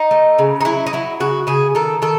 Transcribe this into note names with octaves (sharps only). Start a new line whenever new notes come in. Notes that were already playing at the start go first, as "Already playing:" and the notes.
Already playing: D#4
A3
C#3
D#4
F#3 E4
D#4
F#3 E4
C#3 F#4
C#3 G#4
D#3 A4
D#3 A4